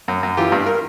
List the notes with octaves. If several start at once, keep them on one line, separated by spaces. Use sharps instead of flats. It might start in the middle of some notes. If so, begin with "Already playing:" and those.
F#2
F#2
E3 F4 G4
G2
A#4